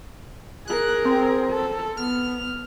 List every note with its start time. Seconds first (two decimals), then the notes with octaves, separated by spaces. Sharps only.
0.67 G#4 A#4 F#6
1.05 C4
1.50 A4
1.97 B3 F6